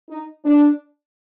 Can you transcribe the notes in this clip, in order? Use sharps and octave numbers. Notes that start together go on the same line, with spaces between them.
D#4
D4